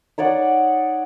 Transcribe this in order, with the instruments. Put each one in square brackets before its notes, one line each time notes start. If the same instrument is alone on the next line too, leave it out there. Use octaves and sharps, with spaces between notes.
[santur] D#4 C#5 D5 F#5